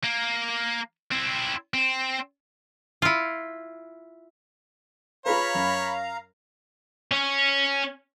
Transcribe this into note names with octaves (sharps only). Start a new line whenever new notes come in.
A#3
C4 E4
C4
E4 F4
F4 G#4 B4 C#5 F5 A#5 B5
F#2
C#4